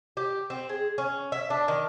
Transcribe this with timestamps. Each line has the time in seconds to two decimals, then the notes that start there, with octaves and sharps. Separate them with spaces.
0.17 G4
0.50 C4
0.69 G#4
0.98 C#4
1.32 E5
1.50 D4
1.68 D#3